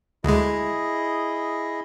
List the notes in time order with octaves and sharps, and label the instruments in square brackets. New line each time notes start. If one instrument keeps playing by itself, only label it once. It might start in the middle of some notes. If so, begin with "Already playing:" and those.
[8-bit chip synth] D2 G#3 [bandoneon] E4 G#4 D#5